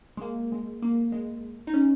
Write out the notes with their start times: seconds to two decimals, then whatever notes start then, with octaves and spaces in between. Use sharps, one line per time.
0.17 G#3
0.22 A#3
0.52 G#3
0.82 A#3
1.12 G#3
1.67 D#4
1.74 C#4